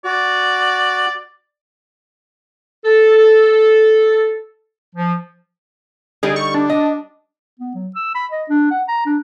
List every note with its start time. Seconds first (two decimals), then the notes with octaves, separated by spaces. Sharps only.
0.05 F#4 D5
2.85 A4
4.96 F3
6.23 D3 G3 D#4 G#4
6.36 C#6
6.54 D4
6.70 D#5
7.59 B3
7.74 F#3
7.95 E6
8.14 B5
8.31 D#5
8.49 D4
8.71 F#5
8.88 A#5
9.06 D4